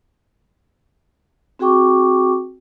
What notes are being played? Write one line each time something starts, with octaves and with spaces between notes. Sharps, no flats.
C4 F#4 G#4 G5 C#6 D6